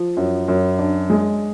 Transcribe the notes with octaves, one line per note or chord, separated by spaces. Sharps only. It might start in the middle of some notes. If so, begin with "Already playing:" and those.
Already playing: F3
F#2
F#2
D4
G#3